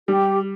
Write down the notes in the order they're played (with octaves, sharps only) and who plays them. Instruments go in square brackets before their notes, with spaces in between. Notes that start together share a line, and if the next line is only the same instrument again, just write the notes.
[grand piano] G3 [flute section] G4